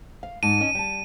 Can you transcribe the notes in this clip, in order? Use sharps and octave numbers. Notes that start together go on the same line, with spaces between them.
F5
G#2 A5 D#7
C#4 D#5
G3 A5